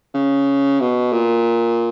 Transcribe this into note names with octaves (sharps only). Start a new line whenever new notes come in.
C#3
B2
A#2